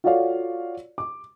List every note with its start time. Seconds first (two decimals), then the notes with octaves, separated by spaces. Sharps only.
0.04 F4 F#4 A4 C#5 D5 F5
0.98 D6